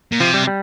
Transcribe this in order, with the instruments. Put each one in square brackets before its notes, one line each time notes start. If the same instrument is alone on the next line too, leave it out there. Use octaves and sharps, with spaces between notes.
[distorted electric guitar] A#2
[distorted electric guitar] C3 [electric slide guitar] F3
[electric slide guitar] G3
G3